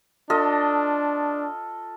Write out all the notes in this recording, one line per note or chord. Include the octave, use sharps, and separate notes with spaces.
D4 F4 A4 D#5